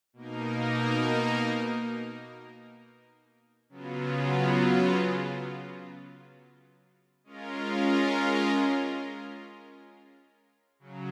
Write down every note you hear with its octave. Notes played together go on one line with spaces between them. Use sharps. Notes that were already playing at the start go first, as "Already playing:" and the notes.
B2 A#3 D#4 A#4
C#3 F#3 B3 F4
G#3 C#4 F4 A#4
C#3 F#3